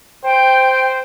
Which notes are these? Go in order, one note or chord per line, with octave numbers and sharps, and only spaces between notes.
C5 G5